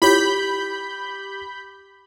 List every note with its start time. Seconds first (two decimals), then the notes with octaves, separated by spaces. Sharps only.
0.02 E4 F4 G4 C#5 B5 G6